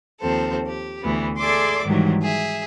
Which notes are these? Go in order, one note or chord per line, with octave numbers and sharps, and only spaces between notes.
D#2 F3 C4 A4
G4
D2 E3 B3
G#4 A4 D5 E5 C6 D6
G#2 D#3 E3 F#3 G3
G#4 E5